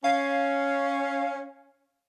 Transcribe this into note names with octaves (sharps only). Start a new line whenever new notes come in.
C#4 F5